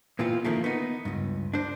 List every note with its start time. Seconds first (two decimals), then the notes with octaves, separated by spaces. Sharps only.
0.19 A#2 E3 B3 C4 F4
0.45 D#3 F3 A3 A#3
0.64 B3 D#4
1.05 C#2 G2
1.54 D4 C5